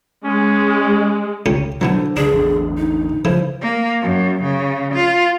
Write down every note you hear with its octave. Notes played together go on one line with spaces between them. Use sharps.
G#3 C#4
C#2 C#4 G4
B2 D3 E3 F#3 C5
C#2 D3 D4 G#4
A1 E2 D3
D#4
C#3 E3 F3 C5
A#3
F#2
C#3
F4